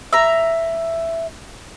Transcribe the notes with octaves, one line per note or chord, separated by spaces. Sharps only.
E5 A#5